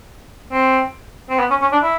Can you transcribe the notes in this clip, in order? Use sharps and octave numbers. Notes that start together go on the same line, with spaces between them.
C4
C4
B3
C#4
C#4
D4
E4